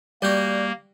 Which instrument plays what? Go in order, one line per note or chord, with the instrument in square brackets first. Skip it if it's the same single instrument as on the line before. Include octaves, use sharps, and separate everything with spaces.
[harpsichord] G3 F#4 [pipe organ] A#3 [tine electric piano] D5 G6